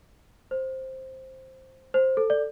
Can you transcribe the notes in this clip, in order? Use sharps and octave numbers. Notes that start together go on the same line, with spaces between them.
C5
C5
A4
D5